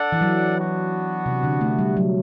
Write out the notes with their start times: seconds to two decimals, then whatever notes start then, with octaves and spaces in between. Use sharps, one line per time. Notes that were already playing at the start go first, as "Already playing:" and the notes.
Already playing: D4 A4 D5 F#5
0.12 E3
0.21 F#3
0.56 B3 D4 F#4
1.26 C3
1.44 D3
1.61 A3
1.79 G3
1.97 F#3